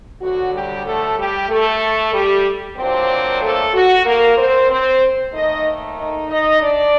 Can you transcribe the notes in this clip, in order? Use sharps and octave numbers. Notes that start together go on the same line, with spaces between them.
D2 D3 F#3 F#4
G3 G4
A3 A4
G3 G4
A3 A4
G3 G4
A#2 F#3 A#3 C4 D4 C5
A3 A4
F#4
A#3 A#4
C4 C5
C4 C5
D#2 D#3 A3 D#4 D#5
D#4 D#5
D#4 D#5
D4 D5